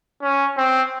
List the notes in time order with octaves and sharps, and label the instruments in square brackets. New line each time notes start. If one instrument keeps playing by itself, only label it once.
[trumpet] C#4
C4